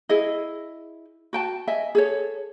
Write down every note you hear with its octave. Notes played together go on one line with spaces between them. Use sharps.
E4 G#4 D#5
F#4 G5 A5
D#5 E5 G#5
G#4 A4 C#5